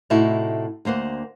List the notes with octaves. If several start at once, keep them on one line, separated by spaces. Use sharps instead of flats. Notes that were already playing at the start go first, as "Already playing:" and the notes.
A2 C3 D#4 E4 F#4
D2 A#3 C5 F#5